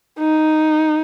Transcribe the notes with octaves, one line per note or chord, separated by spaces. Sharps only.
D#4